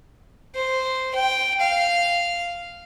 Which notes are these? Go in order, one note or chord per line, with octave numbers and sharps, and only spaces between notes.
C5
G5
F5